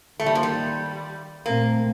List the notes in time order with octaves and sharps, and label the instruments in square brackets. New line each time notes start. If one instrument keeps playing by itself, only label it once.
[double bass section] D#3 [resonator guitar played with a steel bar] A3
[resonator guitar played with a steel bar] G3 [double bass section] A#3
[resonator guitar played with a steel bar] F3
G3
[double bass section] A#2 A3 C4 [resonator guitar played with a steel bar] A#3